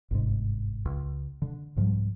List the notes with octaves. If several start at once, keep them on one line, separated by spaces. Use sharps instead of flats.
G1 C2 G#2
C#2
D3
C2 G#2 F3 G3